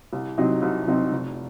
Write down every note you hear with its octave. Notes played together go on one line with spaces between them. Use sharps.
C2
C3 F#3 C4 D#4
C2
C3 F#3 C4 D#4
F1